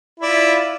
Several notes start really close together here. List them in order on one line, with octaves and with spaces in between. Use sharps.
E4 D5 F4